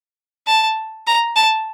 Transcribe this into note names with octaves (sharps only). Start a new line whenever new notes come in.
A5
A#5
A5